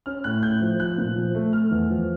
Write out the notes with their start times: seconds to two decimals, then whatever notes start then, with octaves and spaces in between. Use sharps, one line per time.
0.06 C#4 F6
0.24 A2 F#6
0.42 A2 G6
0.61 F3
0.80 F3 F#6
0.98 A#2
1.16 F3
1.35 A3
1.53 A3 F6
1.71 E2
1.90 F3